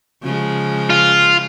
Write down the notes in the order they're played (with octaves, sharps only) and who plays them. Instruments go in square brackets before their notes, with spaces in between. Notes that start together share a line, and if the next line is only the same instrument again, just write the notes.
[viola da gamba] C#3 F3 G#3
[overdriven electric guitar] F4